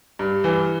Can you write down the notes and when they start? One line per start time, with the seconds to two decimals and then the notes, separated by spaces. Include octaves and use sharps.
0.19 G2
0.44 E3